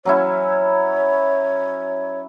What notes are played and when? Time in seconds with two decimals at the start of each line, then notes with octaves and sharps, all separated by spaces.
0.05 F#3 C#4 E4 C#5